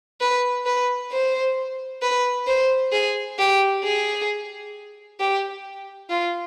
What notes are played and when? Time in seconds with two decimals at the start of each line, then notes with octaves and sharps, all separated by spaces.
0.21 B4
0.66 B4
1.12 C5
2.02 B4
2.47 C5
2.92 G#4
3.39 G4
3.84 G#4
5.20 G4
6.10 F4